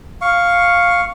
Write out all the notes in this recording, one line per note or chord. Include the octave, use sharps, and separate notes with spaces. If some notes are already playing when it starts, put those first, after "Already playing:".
F5 C#6